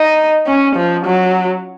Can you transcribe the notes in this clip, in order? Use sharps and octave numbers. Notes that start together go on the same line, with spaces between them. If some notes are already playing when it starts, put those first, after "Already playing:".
Already playing: D#4
C#4
F3
F#3